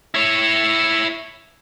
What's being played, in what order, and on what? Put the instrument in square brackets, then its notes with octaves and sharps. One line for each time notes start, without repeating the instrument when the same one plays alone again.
[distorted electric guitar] E4 C#5